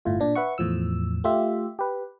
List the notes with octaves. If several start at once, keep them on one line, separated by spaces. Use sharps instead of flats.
G1 A2 E4 F4
A#2 D4
B4 E5 F#5 C#6
E2 A2 F3 E6
A3 F4 G4 E5
G4 B4